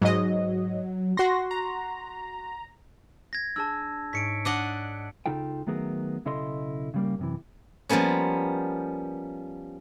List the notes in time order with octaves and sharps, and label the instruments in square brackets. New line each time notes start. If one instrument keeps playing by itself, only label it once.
[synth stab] G#2 D#5 [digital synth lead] F#3
[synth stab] F#4 C6 [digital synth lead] A#6
[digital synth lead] A#5
[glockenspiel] G#6 A#6
[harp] D4 G#4 [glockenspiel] A5 E6
[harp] G#2 C#5 [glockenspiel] B6 C#7 D7
[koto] D4 D#5 F#5
[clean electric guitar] C#2 C#3 D#4 F4 A4 G5
D#3 F#3 A3 B3 G#4 A#4
B1 C#3 E4 A4 D#5 C6
C#3 G3 A#3
F#2 C3 E3
[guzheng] F3 G3 A#3 B3 C#4